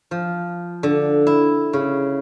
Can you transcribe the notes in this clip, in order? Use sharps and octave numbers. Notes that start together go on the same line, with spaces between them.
F3
D3
E4
C#3